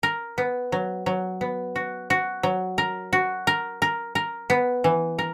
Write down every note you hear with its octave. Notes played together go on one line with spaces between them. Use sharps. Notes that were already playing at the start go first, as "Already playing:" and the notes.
A#4
B3
F#3
F#3
B3
F#4
F#4
F#3
A#4
F#4
A#4
A#4
A#4
B3
E3
A#4